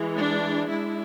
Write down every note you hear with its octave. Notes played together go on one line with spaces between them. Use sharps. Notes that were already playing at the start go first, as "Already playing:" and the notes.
Already playing: E3 G#3
D4
G#3 D4 E4